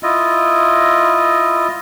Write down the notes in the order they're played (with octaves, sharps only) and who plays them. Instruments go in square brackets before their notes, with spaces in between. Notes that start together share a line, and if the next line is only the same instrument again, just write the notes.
[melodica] E4 F4 D#5